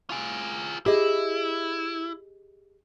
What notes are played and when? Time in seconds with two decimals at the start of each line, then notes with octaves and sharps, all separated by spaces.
0.10 F4 G#4
0.86 E4 G4 G#4 D#5